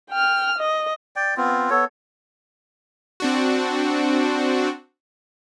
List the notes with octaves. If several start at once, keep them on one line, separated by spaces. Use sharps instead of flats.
G5 F6
D#5
D5 G5
B3 C4 F4
B3 A4 C#5
C4 D4 F#4